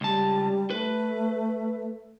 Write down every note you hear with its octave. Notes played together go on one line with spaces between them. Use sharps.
C#2 G3 A5
A3 B4